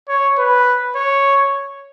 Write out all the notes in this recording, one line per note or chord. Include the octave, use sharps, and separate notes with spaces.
C#5
B4
C#5